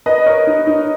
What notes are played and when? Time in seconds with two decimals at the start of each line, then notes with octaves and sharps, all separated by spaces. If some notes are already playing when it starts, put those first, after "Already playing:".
0.06 B4 D#5
0.26 A#4 C#5
0.47 D#4
0.67 D#4